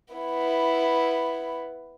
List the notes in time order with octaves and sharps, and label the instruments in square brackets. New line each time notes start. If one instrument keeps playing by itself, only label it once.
[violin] B3 E4